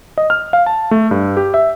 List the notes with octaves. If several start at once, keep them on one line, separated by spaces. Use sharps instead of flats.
D#5
F6
F5
A5
A3
G2
G4
E5